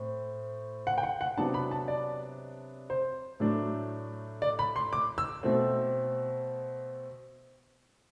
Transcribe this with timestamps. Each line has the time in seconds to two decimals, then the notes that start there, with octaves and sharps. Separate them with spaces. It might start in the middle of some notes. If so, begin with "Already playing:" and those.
Already playing: A2 C4
0.87 F#5
0.98 G5
1.03 F#5
1.21 F#5
1.37 C3 F#3 B3 D4 A5
1.54 B5
1.71 A5
1.88 D5
2.90 C5
3.40 A2 F#3 A3 D4
4.42 D5
4.59 B5
4.76 C6
4.93 D6
5.18 E6
5.43 B2 A3 C4